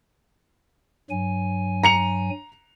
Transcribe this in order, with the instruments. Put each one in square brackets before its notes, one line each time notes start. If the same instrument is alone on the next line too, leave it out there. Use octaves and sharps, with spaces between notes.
[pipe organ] G2 F#3 G#5
[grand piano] A#5 C#7 F7